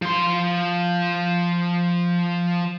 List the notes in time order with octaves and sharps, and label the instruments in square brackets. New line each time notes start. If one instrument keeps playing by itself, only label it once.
[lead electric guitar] F3 C6